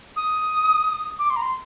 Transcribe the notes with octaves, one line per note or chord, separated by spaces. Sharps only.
D#6
D6
C6
A#5
C6